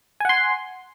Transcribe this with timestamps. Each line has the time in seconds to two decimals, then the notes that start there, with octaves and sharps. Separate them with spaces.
0.20 G#5
0.25 F#5
0.29 C6